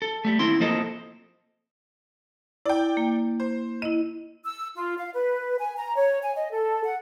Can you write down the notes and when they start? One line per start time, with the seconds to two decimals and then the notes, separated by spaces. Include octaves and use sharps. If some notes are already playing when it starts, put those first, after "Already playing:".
0.02 A4
0.25 G3 A3
0.39 D#2 C4 E4 C6
0.60 F3 A#3 C4 A4 D#5
2.66 E4 D5 G5
2.97 A#3
3.40 C5
3.82 E4 D#5 D#7
4.44 E6
4.75 F4
4.98 F5
5.13 B4
5.59 G#5
5.77 A#5
5.96 C#5
6.22 G#5
6.36 D#5
6.51 A4
6.84 F#5